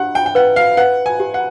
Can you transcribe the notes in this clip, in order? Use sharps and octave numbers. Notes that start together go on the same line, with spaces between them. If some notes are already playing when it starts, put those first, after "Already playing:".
Already playing: D4 G4 F#5
G5
G5
B4 F#5
F5
B4 F#5
G#5
G4
F#5